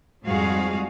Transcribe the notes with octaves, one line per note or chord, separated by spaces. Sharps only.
F2 G#2 G3 F#4 G#4 F5